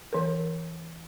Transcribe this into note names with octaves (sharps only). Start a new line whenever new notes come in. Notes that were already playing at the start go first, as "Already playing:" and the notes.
E3 A#4